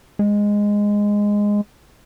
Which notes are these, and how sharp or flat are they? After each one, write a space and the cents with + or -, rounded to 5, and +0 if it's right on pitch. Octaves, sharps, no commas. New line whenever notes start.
G#3 -10